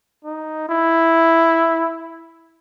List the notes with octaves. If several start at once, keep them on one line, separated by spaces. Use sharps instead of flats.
D#4
E4